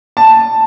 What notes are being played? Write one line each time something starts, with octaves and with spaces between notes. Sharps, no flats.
A5